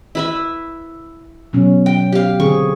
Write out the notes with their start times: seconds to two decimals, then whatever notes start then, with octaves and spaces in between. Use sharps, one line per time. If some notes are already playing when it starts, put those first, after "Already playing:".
0.15 E4 B4 E5
1.53 B2 F#3 C#4
1.86 G5
2.13 G4 F5
2.40 D3 C4 G#4 C#6